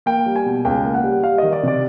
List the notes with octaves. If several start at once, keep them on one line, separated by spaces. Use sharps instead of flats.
A#3 G5
G3
G#5
B2
C#2 G5
A#3
F#5
G3
G3 F5
D#3 D#5
D5
C3 D5